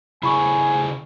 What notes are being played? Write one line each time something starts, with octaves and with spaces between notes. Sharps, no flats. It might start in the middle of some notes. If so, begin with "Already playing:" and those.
C#3 E4 G#4 G#5 B5 C#6